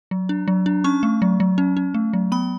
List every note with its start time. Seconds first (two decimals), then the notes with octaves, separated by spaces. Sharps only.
0.11 F#3
0.29 D4
0.48 F#3
0.66 D4
0.84 C#4 C#6
1.03 A3
1.22 F#3
1.40 F#3
1.58 C#4
1.77 C#4
1.94 A3
2.13 F#3
2.32 B3 B5